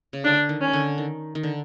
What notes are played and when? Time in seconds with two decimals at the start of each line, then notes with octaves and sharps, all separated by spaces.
0.13 C#3
0.24 D3 D4
0.49 D#3
0.61 C#4
0.73 D3
0.98 D#3
1.35 D#3
1.43 D3